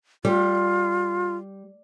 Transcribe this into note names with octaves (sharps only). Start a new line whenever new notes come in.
G3 F4